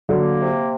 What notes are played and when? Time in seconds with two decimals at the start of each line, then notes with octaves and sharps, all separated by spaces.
0.09 D3 F#3 A#3
0.40 C3